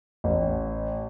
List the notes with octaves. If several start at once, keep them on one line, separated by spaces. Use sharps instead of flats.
A1